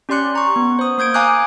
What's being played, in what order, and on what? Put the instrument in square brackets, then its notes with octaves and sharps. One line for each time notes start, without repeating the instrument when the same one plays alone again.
[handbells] C#4 G4 D5 C6 F#6 C#7
A#5 C#6
B3
C5 D#6
A#3 D#6 G6 G#6 D7
F5 G#5 A#5 D6 D#6 F#6